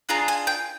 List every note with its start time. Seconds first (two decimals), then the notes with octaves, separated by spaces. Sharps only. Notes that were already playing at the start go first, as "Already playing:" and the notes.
0.09 D4 F4 G#4 A#5
0.28 G#5
0.47 G5